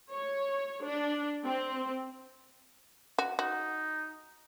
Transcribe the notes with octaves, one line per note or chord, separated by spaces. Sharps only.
C#5
D4
C4
F#4
D#4 F#4